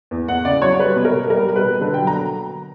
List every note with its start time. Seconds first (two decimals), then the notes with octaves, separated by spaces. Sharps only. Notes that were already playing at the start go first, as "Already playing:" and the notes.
0.11 E2
0.28 E2 F#5
0.45 C#3 D5
0.62 F#3 C#5
0.79 G3 B4
0.96 B2
1.05 A#4
1.13 B2
1.30 G3 A#4
1.47 G3
1.56 B4
1.64 B2
1.81 D3 B4
1.94 G5
1.99 F#3
2.07 A#5